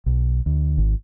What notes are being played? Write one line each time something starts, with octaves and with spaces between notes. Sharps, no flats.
B1
D2
G#1